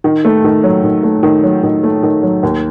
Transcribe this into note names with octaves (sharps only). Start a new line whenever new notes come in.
D#3
A3
D#3
F#3
D#3
A3
D#3
F#3
D#3
A3
D#3
F#3
D#2